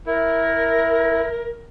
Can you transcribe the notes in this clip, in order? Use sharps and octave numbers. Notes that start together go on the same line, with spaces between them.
E4 A#4